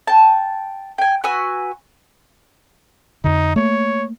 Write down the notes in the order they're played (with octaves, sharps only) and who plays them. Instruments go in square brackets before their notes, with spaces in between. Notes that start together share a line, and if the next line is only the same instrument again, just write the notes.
[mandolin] G5 A5
G5 G#5
F#4 B4 G#5 E6
[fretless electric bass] F2 D3 [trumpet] D#4
[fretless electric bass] A3 A#3 [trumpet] C#5